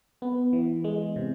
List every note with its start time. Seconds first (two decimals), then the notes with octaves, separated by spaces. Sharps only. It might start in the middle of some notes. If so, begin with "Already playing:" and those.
0.22 B3
0.53 E3
0.84 G#3
1.16 C3